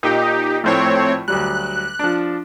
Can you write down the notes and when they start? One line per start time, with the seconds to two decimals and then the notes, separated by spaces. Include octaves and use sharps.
0.03 A#2 D#4 G4
0.64 A#1 A2 A3 C4 C#5
1.28 D2 F#3 G3 F#6
1.99 F3 D4